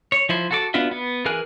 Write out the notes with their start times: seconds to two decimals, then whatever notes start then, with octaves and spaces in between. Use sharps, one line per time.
0.12 C#5
0.29 F3 E4 C5
0.51 F#4 A4 D6
0.74 B3 D4 F4 F#4 E5
0.91 B3
1.25 E3 G#4 A#4 G#5 F#6